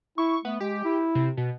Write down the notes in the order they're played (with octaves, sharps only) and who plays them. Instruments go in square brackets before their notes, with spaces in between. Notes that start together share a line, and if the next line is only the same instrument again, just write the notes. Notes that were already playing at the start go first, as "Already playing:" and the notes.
[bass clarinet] E4 [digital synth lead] C#6
[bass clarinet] A3 [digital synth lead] B3
[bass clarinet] G#3 [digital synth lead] G4
[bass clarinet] E4
[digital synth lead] C3
B2